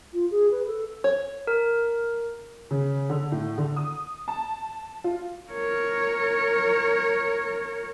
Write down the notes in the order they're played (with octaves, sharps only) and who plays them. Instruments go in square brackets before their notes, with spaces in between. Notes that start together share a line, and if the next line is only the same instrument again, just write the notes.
[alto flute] F4
G#4
B4
A4
[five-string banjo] C#5
[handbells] A#4
[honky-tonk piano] C#3
D3
A2
D3
D#6
A5
F4
[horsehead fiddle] A#4 C#5